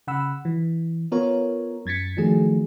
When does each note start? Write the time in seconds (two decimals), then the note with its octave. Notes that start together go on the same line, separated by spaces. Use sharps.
0.07 C#3 F#5 B5 E6
0.45 E3
1.12 B3 F4 A#4 C#5
1.86 F#2 G#6 A6 B6 C#7
2.17 D#3 F3 F#3 A3 G#4